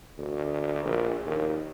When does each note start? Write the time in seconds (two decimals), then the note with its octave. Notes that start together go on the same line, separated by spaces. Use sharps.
0.18 D2
0.85 A#1
1.25 D#2